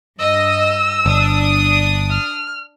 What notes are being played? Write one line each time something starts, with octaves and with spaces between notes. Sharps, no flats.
G2 D#5 E6
G1 D4 D#6
F6